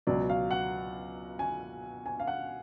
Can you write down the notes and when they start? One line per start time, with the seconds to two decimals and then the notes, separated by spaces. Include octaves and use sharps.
0.07 C#2 B2 F#3 D5
0.29 F5
0.51 F#5
1.39 G#5
2.06 G#5
2.20 F5
2.27 F#5